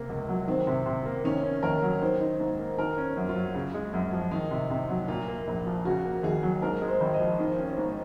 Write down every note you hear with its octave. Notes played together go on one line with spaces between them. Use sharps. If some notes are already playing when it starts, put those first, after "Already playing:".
Already playing: C3 A#3
C#2
F#3
D#3 C4
C3
C3
A#3
D#3 C#4
C#4
D#2 A#4
F#3
D#3 C5
D#4
G#2
A#3
D#3 A#4
C#4
F#2
F4
F#3
C#3
G#3
F#2
F3
D#3 D#4
C3
C3
F#3
A#2 F4
A#3
A#1
F3
C#3 F#4
A#3
D#2 G#4
F#3
G#2 A#4
G#3
C5
G#1
D#5
F3
D#3
C#4
G#2